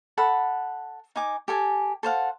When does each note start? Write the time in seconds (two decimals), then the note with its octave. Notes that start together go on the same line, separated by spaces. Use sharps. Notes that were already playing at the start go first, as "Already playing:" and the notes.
0.17 A4 F#5 B5
1.16 D#4 G#5 D6
1.48 G4 A4 G#5
2.03 A4 C5 F5 F#5